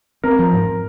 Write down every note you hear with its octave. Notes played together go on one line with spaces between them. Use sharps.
C4 A#4
F3
G#2